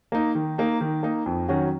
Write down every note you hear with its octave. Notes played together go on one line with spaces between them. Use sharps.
A#3 D#4
D#3
A#3 D#4
D#3
A#3 D#4
F2
D#3 F#3 C#4 F#4